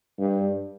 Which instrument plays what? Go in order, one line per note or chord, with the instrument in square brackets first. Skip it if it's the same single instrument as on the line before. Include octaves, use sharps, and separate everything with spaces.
[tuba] G2